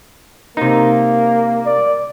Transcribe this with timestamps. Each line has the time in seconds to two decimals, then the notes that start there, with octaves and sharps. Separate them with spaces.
0.57 C3 A#3 D#4
1.66 D5